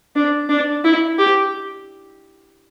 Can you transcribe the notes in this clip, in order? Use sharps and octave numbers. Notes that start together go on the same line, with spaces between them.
D4
D4
E4
G4